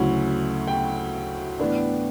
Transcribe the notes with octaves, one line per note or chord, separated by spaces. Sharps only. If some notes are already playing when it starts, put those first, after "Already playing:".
Already playing: D2 C#3 F#3 C#4 E4
G5
A2 E3 B3 D4